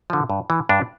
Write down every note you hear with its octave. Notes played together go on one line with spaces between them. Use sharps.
D3 F3
G2
E3
G2 D4